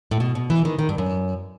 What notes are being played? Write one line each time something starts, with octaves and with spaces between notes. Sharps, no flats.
A2
B2
B2
E3
D#3
D#3
G2
F#2